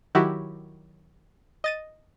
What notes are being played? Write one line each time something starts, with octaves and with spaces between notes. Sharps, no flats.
D#3 F#3 E4 F#4 G4
D#5 A6 D#7